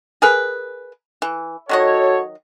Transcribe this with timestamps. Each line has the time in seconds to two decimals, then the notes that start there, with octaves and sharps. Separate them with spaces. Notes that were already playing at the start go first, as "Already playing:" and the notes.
0.22 G#4 A#4 B4
1.22 E3
1.69 D#3 F#3 F#4 A4 C#5 D#5